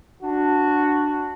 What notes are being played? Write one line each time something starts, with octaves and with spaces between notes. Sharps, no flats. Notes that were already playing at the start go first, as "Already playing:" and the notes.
D4 F#4